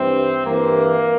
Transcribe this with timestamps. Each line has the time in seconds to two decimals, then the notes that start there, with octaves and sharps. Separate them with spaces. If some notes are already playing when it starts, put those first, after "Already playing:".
Already playing: G2 E3 C4
0.45 G2 E3 A#3